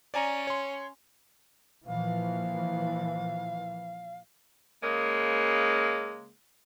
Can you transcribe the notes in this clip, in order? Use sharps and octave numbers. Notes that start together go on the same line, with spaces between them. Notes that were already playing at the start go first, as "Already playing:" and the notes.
C#4 D5 G#5 A#5
C#5 C6
A#2 E3 F3 F5
C#3 G#3 A#3